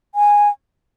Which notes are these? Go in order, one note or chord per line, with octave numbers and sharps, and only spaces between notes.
G#5